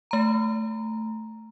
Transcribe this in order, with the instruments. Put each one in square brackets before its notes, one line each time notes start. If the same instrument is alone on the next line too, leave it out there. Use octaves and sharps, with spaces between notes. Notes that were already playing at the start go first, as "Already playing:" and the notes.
[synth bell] A3 A#5